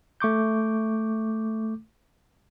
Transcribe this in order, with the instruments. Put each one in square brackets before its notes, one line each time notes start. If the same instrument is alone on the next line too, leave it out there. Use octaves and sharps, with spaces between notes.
[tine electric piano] A3 C#6 D6 G6